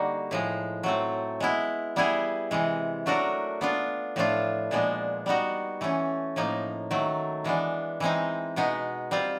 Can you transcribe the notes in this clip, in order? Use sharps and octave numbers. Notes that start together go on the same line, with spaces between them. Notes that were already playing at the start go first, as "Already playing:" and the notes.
Already playing: D3 G3 A#3 D#4 F#4
A2 F3 G#3
F#3 A3 C4
G#3 B3 E4
G3 B3 E4 G#4
C3 E3 G#3
F#3 A3 D4 F#4 A#4
B3 D4 F4
A2 F3 A3 D4 F4
A#2 F3 G#3 B3 D4
G3 B3 D#4 F#4
E3 A3 C#4
A2 F3 A#3 D#4
D#3 F#3 A3
E3 G#3 B3 D4
E3 G#3 C4 D#4
B2 G#3 B3 D#4
G3 C4 F4